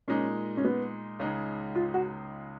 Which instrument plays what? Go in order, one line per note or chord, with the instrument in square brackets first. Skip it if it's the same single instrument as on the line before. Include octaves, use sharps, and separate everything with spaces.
[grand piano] A#2 G#3 D#4 [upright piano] C#4
[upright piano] C#4
B3
[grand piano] C#2 C#3 G#3 D#4
[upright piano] F4
F#4